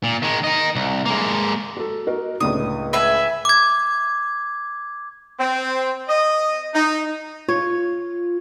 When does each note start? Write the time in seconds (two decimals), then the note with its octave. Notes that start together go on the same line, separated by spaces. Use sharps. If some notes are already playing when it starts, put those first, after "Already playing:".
0.04 A#2
0.22 D#3 G#3
0.44 A#4 D#5
0.75 C2
1.06 G#3 A#3
1.77 F#4 A4
2.07 F#4 A#4 D#5
2.40 C#2 A2 D3 D#6
2.93 B4 E5 G#5
3.45 D6 G#6
5.39 C4
6.08 D#5
6.74 D#4
7.49 F4 C#5